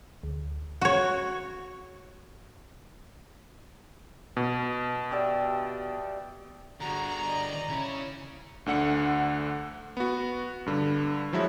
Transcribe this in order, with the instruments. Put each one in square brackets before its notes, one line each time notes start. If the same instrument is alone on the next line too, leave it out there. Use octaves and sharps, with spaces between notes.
[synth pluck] D2
[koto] F#4 C#5
[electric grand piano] B2
[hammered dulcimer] G4 D5 E5
[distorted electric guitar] G2 D3 [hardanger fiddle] F#4 G#4 [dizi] A#5
[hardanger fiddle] D5 D#5
[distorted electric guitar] C#3 C#4 [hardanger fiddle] E4
[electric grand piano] D2 D3 F#5 C#7
B3 F#4
G2 D3
F3 F#3 G#3 E4